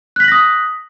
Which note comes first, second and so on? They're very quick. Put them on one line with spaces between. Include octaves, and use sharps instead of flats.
F#6 B6 F#7 A#6 D#6